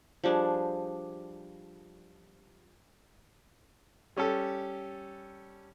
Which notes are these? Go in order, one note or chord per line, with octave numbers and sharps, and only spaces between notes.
F3 G3 D4 G#4
G3 C#4 G4 A4